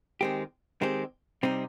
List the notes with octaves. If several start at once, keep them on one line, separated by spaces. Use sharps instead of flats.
D#3 G#3 C4 G4
D#3 G#3 C4 G4
C3 G3 C4 D#4